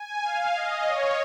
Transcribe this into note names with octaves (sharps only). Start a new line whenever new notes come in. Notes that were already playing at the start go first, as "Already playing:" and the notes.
Already playing: G#5
F5
D#5
C#5